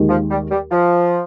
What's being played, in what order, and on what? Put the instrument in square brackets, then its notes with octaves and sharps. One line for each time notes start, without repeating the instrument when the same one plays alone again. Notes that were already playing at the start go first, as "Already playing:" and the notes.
Already playing: [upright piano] D#2 D#3 G#3
[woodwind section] F3
G3
G3
F3